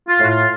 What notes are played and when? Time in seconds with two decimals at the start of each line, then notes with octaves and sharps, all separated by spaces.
0.08 F4
0.19 A2
0.24 F#4
0.28 F4